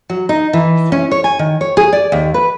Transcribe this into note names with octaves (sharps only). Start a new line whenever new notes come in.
F#3
D#4
E3
C#4
C#5
G#5
D#3
C#5
G#4
D5
D#2
B4